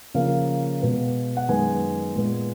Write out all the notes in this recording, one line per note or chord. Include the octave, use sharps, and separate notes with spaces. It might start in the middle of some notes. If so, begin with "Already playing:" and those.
C#3 F3 A#3 F5
B2 G#3 B3
F#5
F#2 D#3 G#3 B3 G#5
A#2 G#3 B3